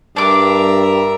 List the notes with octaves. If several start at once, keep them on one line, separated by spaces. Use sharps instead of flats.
G2 D4 A#4 E5 D6